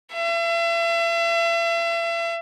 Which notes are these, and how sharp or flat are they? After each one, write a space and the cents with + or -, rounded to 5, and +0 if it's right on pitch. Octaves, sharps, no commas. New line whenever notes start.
E5 +40